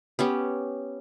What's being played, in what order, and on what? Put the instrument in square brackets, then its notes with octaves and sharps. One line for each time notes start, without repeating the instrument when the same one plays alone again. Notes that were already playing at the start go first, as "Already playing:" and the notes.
[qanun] B3 C#4 G4